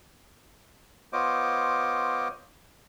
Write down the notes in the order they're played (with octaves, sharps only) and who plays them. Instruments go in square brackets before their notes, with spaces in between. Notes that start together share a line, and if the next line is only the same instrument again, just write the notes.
[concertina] B3 F4 C5 C#5 D#5 D6